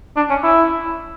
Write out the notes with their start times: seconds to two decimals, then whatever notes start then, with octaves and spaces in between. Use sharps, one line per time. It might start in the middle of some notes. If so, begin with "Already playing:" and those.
0.17 D4
0.30 C#4
0.43 E4